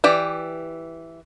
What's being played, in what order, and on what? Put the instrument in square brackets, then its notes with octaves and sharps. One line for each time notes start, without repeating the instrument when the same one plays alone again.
[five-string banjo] E3 G4 D5